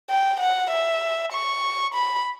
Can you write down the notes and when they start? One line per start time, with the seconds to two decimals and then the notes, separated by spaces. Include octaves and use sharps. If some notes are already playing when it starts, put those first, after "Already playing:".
0.10 G5
0.40 F#5
0.70 E5
1.32 C#6
1.94 B5